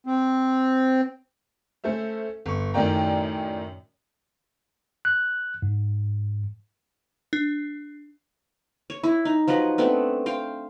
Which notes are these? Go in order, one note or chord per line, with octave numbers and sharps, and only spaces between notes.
C4
A3 C#4 A4 C5 E5
G1 C#6
F#2 A2 D#3 D5 G5 A#5
F#6
G#2
D4
C#5
E4
D#4
F3 F#3 B4 D#5
A3 B3 C4 D4
C5 F5 G5